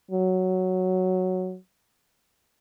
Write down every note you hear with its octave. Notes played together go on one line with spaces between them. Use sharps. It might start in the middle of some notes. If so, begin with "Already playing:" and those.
F#3